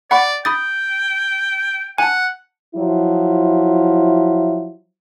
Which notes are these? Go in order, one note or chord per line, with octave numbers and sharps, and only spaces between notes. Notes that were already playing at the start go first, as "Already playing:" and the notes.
D5 F#5 B5 C#6
G5 B5 D#6 A6
F#5 G#5 A5
F3 F#3 E4